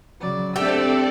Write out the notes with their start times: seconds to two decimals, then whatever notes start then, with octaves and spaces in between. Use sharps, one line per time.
0.21 C#3 F#3 D5
0.56 G#3 A3 C4 D4 G4 A4 D5 E6